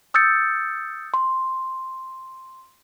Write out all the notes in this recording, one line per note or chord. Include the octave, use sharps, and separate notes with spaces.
D#6 E6 G6 A6 C#7
C6